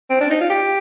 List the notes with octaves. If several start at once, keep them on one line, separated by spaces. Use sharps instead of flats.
C4
D4
D#4
F4
G4